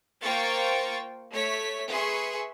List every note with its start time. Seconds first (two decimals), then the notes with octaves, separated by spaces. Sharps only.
0.21 A#3 F4 C5 G5 C#6 A6
1.30 A3 C#5 B6
1.89 G#4 B4 E5 C6 C#6